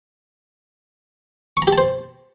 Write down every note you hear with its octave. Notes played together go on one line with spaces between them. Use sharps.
C#6
A#5
G4
A5
C5